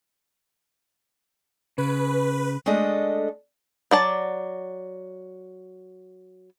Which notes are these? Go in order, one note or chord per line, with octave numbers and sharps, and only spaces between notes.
C#3 B4
G#3 A3 D4 A4 D#5
F#3 D5 A5